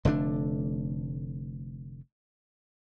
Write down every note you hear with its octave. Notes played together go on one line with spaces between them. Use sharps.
F1 D3 A3 D4